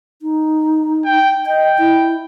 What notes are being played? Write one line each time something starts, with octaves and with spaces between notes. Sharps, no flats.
D#4
G5
D#5 G5
E4